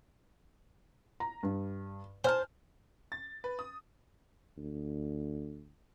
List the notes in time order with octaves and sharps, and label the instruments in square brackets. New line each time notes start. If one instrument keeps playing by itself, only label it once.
[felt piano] A#5
G2
[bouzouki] C5 A5 [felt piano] G#5 F6
[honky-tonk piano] A6
B4
D#6
[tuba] D2